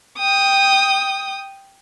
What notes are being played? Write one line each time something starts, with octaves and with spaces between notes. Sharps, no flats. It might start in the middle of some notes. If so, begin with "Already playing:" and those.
G5 D#6